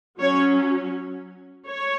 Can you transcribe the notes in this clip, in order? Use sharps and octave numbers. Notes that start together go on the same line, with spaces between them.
F#3 C#4 C#5
C#5